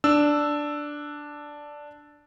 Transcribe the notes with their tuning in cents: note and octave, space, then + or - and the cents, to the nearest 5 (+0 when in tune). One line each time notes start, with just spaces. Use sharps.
D4 +0 E6 +0